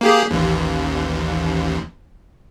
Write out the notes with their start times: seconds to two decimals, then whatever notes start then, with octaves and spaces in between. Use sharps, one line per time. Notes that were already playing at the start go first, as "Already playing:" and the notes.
0.01 A#3 G4 G#4
0.31 A1 D#2